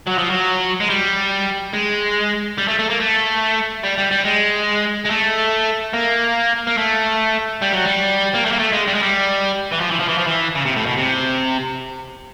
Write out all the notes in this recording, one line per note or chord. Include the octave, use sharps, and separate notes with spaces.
F#3
F3
F#3
G#3
G3
G#3
G3
A3
A3
A#3
A3
G3
G3
G3
G#3
G#3
A3
A#3
A#3
A3
G3
F#3
G3
A#3
A3
A#3
A3
G#3
G3
G#3
G3
E3
F3
E3
F3
E3
F3
E3
C#3
C3
A2
B2
C3